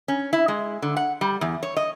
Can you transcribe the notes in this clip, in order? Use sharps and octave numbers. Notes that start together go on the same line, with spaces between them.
C#4
E4
G#3
D3
F#5
G3
E2
C#5
D#5